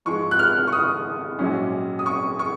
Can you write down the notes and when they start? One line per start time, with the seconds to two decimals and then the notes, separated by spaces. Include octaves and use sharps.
0.05 G#2 F3 G#3 C#6
0.31 F#6
0.39 F6
0.67 C#6
0.73 D#6
1.39 A#1 G#2 F#3 C#4
1.99 D#6
2.06 C#6
2.39 C#6